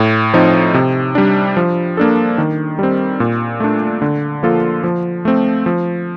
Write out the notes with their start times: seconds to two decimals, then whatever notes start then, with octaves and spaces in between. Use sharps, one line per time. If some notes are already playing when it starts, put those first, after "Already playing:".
Already playing: A2
0.34 F3 C4 D#4
0.74 C3
1.15 G3 D4
1.57 F3
1.97 A#3 D4 A4
2.38 D#3
2.79 G3 C4
3.20 A#2
3.60 A3 D4
4.02 D3
4.43 F3 A#3 F4 A4
4.84 F3
5.25 A3 C4
5.66 F3